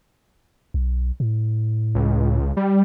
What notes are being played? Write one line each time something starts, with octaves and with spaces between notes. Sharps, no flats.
B1
A2
C#2
G3